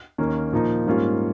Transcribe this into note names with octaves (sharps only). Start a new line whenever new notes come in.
D#2 D#3 A#3 C#4
A#2 F3 A#3 D#4
G#2 G3 A#3 C#4 F4